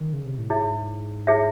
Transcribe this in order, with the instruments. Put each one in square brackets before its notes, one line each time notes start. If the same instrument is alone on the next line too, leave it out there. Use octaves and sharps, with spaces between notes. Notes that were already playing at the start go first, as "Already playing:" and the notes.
[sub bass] D#3
C#3
C3
A2
[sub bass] G#2 [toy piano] E4 G#4 C#5 E5
[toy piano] E4 G#4 C#5 E5